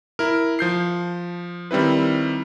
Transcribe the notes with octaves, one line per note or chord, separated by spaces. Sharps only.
E4 A#4
F3 G6 C7
D#3 G3 C4 E4 B4